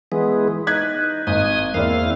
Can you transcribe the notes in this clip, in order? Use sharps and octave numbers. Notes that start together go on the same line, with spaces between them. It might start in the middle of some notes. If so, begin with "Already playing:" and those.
E3 G#3 B3
D#4 F#6 G#6 B6
G#1 D#5 G#5 D#6
E2 A#3 C4 E4 D5 F5